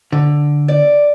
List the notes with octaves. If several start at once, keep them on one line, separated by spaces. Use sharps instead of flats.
D3
D5